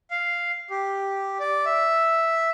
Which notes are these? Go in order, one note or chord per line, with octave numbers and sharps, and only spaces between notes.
F5
G4
D5
E5